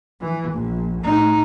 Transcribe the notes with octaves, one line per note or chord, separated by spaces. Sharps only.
E3
A#1
A2 D#4